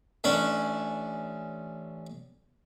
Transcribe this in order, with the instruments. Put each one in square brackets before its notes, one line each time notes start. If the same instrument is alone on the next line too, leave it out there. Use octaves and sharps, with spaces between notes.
[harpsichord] A1 C#4 D4 B5